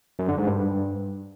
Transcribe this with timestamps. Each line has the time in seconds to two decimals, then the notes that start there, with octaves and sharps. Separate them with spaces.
0.19 F#2
0.28 D3
0.38 G#2
0.47 G2